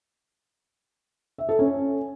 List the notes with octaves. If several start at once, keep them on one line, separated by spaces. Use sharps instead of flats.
E5
A4
C#4